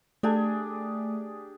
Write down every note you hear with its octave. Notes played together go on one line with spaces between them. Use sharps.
A3 D4 G4 G#4